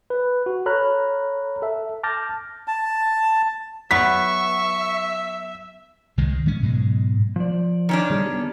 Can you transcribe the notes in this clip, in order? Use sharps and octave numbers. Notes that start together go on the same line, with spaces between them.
B4
F#4
A4 C#5 A#5 B5 F6 F#6
A4 E5
A5 D6 F6 G6 A6 A#6
A5
F#3 B3 E5 C#6 B6
C2 D#3 G#3
E3 G#3 C#4
G#2 B2 F#3 G#3
F3 C5 D5
D#3 C#4 D4
D3 G3 G#4
B3 G4